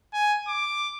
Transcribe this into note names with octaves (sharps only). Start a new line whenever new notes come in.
G#5
D6